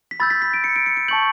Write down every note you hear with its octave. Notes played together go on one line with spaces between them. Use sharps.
B6
B5 E6 G6 A6
B6
B6
D7
C#7
D7
C#7
D7
A5 C#6 G6 F#7